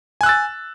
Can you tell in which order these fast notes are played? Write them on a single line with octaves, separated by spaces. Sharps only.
G#5 F#6 E6 A6